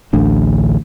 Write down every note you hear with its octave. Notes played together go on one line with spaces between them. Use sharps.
A1 D2 D3